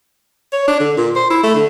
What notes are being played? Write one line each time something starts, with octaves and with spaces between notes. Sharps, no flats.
C#5
D4
D3
A#2
C5
E4
A3
D3